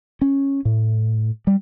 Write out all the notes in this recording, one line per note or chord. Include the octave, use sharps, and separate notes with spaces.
C#4
A2
G3